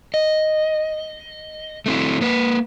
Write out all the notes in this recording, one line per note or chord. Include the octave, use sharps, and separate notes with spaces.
D#5
A3 C4 E4
A#3 B4